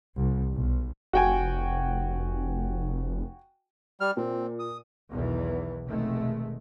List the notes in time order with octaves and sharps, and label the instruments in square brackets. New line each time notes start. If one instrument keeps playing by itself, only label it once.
[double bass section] C2
B1
[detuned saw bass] F1 [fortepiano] F#4 G5 G#5
[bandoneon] G3 F6
[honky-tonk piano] A#2 [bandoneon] C4
[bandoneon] D#6
[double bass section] B1 E2 B2 D#3 E3
F1 B2 D#3 G#3 A3